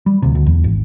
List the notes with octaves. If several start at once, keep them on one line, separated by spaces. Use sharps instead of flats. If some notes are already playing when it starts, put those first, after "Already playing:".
G3
D2 C3
D2
E2
G#1